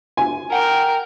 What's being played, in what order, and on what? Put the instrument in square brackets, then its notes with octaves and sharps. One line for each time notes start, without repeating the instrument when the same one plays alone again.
[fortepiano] G#5
[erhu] A#4 [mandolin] F#5 G5 D6